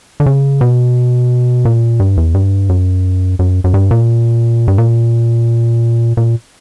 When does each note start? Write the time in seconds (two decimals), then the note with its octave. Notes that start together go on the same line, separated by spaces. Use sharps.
0.20 D3
0.26 C#3
0.61 B2
1.65 A#2
2.00 G2
2.17 E2
2.35 G2
2.69 F#2
3.39 F#2
3.64 F#2
3.74 G2
3.91 A#2
4.68 G2
4.78 A#2
6.17 A#2